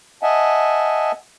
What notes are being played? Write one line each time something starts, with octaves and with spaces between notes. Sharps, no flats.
D#5 E5 F#5 G#5 A5